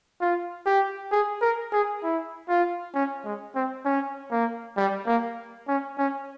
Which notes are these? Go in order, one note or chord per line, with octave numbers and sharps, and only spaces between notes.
F4
G4
G#4
A#4
G#4
E4
F4
C#4
G#3
C4
C#4
A#3
G3
A#3
C#4
C#4